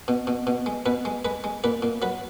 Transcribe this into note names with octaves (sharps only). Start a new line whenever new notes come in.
B2
B2
B2
G#3
B2 B4
G#3
G#3 B4
G#3
A#2 B4
A#2
F#3 B4